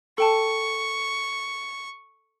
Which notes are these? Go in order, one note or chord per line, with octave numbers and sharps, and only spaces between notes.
A4 G5 A5 C#6